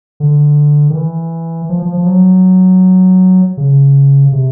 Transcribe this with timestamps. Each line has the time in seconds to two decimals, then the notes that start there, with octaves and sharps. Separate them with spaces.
0.20 D3
0.90 D#3
0.94 E3
1.69 F3
1.82 F3
1.94 F3
2.06 F#3
3.57 C#3
4.32 C3